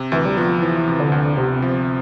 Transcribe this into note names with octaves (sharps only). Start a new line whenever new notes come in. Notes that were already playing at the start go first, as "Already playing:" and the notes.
Already playing: C3
D2 E3
G3
F3 B3
E3 F3
C3
D3
D2
C3 B3
F3